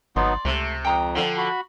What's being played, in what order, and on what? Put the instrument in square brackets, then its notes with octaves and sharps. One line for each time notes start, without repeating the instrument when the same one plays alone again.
[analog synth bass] G#1 [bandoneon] F#3 B3 D#4 [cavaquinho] D5 C6
[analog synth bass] C#2 [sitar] C3 [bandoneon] A3
[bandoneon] F2 [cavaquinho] G5 A#5 D#6
[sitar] D3 F3
[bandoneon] F#4 B5